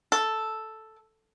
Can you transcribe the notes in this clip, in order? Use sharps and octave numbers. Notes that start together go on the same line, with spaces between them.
A4